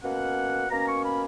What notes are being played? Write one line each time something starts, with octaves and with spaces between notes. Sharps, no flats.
B2 A#3 C#4 F#5
B2 A#3 C#4 A#5
C#6
B5